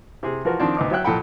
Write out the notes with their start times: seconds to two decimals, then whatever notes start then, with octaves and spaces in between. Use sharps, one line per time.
0.23 C3 G#4
0.45 E3 F3 F4 F#4 A#4
0.60 D#3 F3 C4 D4
0.77 D2 B3 D#4 D6
0.91 F#3 C#5 E5 G5 F#6
1.04 F2 A#2 A4 F#5 G5 B5